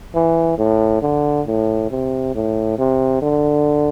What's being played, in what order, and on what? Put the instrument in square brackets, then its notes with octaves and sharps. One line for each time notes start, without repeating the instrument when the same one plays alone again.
[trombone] E3
A2
D3
A2
C3
A2
C3
D3